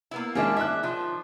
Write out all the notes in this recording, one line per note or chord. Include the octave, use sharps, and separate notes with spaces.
A#3 B3 E4
D#3 G#3 A#3 C#4 D4 E5
E5 D6 F#6
D#3 F3